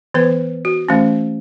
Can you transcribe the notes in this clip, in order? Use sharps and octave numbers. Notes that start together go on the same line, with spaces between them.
E3 B3 B4
F#4
E3 A3 C#4